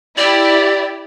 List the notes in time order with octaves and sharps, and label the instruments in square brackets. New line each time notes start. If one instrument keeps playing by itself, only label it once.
[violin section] E4 G4 [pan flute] D5